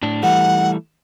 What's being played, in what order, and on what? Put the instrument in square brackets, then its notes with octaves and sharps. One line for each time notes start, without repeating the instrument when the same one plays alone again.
[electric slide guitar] A2 D4
[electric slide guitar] E3 G3 A3 [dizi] F#5